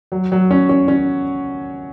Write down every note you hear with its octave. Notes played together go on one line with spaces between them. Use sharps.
F#3
F#3
C#4
C#4
C#4